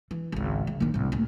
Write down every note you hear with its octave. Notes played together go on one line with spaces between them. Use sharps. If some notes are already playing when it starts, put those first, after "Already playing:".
E3
G#1 C#2
C#3
A#1 D#3
C2 A2
D2 A#2